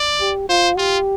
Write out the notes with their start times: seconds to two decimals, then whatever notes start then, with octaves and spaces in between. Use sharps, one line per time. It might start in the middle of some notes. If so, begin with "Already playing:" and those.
Already playing: D5
0.21 G4
0.49 F4 C5
0.78 F4 G4